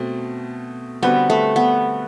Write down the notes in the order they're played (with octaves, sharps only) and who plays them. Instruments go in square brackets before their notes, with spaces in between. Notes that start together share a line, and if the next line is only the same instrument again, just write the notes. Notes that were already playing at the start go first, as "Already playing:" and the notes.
Already playing: [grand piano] B2 A3 C4
[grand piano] D3 G3 C4 F#4 B4 [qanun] B3
[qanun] A3
B3